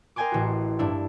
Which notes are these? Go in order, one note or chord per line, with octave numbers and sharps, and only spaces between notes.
A#4 D#5 G5 G#5 C6 D6
A1 F#4
G2 D4 E4